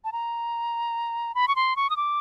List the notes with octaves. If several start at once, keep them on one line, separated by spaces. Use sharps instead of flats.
A5
A#5
B5
C#6
C6
C#6
D#6
D6